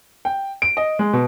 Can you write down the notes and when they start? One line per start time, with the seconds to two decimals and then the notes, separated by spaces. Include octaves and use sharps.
0.25 G5
0.62 D7
0.77 D#5
0.99 G#3
1.13 B2